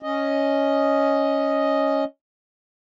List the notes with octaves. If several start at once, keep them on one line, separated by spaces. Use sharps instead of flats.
C#4 D#5